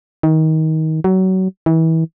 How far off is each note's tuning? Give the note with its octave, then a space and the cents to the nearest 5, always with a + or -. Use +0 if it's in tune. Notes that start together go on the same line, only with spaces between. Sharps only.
D#3 +25
F#3 +25
E3 -30